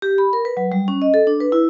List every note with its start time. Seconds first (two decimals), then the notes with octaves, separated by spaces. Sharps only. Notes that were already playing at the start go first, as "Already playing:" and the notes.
0.02 G4
0.18 B5
0.33 A#4
0.45 B4
0.57 F#3
0.72 G3
0.88 C#4
1.02 D#5
1.14 A4
1.27 D4
1.40 B4
1.52 E4